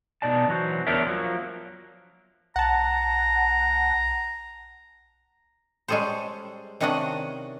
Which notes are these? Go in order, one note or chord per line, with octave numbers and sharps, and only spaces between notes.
B2 D#4 D5 A5
E3 F#3 F#4 C5
E2 B3 D4 A#4 C#5 E5
F3 F#3 A#3
B1 F#5 A5 A#5
G3 G#3 C#4 G#4 A4 C5
C3 D#3 C#4 D4 D#5 F#5